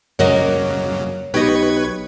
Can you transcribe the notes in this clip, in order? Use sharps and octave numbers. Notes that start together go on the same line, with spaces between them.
F#2 C#3 F#3 A#3 F#4 C#5 D#5
B1 G4 B4 D#5 C#6 G#6